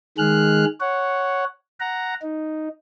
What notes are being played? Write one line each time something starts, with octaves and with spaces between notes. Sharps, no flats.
D#3 G#3 G#4 F6 F#6
C#5 F#5
F#5 A#5
D#4